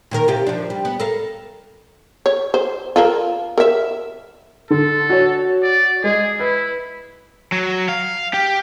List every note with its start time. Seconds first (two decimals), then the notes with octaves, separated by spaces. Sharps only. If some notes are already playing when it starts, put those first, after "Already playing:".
0.11 A#2 D#3 A#4
0.28 C3 F4 G4
0.47 F3 D4
0.70 G3
0.85 B3
1.00 A4 A#4 F5
2.26 C#5
2.54 C5
2.96 F4 A4 A#4
3.58 A#4 E5
4.70 D3 A4
5.10 F#4 C#5
5.63 D5
6.04 G#3 G#4
6.40 E4 B4
7.52 F#3
7.89 F5
8.34 G4